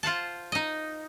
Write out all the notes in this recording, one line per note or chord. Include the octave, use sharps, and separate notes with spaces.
F4 C5 F#5 A5
D#4 D#5